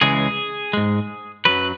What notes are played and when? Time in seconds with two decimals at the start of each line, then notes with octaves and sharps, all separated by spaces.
0.01 C#2 C#3 E3 G#3 G#4
0.73 G#2 G#3
1.45 F#2 F#3 B4